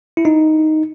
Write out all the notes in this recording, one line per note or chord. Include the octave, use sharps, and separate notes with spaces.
E4
D#4